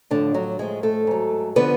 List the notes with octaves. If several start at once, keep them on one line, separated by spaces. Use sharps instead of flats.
A2 D3 F3 D4
F#3 F#4
A2 F3 G#3 G#4
A3 A4
G#2 F#3
D3 F3 B3 B4